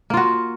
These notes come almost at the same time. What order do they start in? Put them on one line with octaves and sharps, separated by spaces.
A#3 F4 F#4